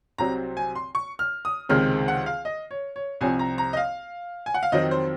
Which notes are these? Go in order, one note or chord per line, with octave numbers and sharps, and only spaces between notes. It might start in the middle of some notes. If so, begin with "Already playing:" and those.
C2 C3 F#3 C4 A#5
G#5
C6
C#6
F6
D#6
C#2 C3 D#3 G#3 C4 F6
F#5
F5
D#5
C#5
C#5
C2 C3 F3 C4 G#5
A#5
A#5
D#5
F5
G#5
F#5
F5
F2 D#3 F#3 C4 D#5
C5